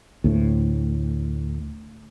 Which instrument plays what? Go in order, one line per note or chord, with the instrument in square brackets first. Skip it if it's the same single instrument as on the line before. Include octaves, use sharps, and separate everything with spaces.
[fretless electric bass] D2 A2